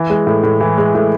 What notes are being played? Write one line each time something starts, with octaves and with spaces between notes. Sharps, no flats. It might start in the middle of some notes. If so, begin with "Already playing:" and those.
Already playing: E3
G#3
A2
A2
E3
G#3
A2